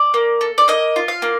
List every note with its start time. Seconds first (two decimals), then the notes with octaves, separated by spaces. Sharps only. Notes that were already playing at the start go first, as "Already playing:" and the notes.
Already playing: D5
0.14 A#3
0.41 A4
0.58 D5
0.68 A#3 D#5
0.96 F4
1.08 F5
1.22 A#3